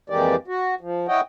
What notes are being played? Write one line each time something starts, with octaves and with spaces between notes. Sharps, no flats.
F2 E3 G#3 A#3 G4 D5
F#4
F3
E4 C#5 D#5 F#5 G5